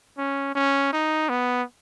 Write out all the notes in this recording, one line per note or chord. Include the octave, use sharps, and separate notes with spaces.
C#4
C#4
D#4
B3